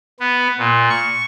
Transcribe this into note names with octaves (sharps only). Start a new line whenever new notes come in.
B3
A#2
C#6